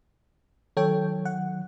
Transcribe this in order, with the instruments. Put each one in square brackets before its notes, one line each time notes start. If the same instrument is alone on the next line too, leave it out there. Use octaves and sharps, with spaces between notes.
[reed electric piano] D#3 F#3 [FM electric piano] A4 C#5 G5
[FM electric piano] F#5